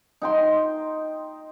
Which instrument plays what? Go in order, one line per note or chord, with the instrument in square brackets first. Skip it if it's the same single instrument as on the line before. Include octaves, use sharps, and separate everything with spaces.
[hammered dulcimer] D#4 G5 C6